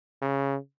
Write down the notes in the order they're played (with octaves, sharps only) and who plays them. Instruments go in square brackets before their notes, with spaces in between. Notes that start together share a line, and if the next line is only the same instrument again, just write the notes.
[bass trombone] C#3